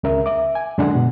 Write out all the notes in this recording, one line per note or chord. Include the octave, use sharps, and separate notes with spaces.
C#2 C#3 A#4 E5
E5 D6
G#5
F#2 D3 G#3 D4 F#5
B2